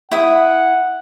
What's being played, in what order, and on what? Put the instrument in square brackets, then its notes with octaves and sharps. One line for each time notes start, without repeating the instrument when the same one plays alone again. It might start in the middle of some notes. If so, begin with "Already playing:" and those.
[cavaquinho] E4 D#6 [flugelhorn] F#5